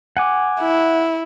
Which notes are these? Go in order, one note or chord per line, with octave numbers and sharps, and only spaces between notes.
F#5 G#5 D6
E4